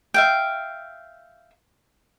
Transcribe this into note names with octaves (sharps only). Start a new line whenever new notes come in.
E5 F5 G5